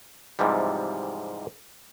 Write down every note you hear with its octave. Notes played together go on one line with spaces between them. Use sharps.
G#2 C3 E3 F3 G3